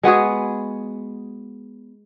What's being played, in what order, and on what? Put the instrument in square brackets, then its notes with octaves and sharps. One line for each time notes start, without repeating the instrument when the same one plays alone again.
[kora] G#3 B3 F#4 G#4